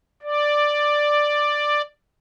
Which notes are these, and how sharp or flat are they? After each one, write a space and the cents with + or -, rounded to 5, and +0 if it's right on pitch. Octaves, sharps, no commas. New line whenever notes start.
D5 +5